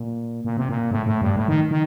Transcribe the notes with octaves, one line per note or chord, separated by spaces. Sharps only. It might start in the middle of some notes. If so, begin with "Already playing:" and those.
Already playing: A#2
A#2
C3
A#2
A2
A2
G2
A2
D#3
D#3